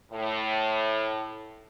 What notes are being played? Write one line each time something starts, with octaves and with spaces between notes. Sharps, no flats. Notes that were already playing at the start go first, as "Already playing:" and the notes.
A2